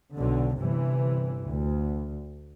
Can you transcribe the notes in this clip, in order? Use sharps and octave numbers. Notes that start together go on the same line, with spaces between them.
B1 D3
G1 C3 E3
D2